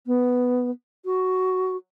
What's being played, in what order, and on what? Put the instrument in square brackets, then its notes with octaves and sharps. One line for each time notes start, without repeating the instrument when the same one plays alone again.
[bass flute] B3
F#4